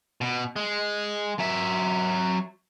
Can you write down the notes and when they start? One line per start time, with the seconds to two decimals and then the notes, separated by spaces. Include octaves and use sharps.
0.21 B2
0.56 G#3
1.39 F#3 E5